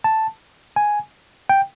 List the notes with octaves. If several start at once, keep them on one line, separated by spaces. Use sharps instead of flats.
A5
G#5
G5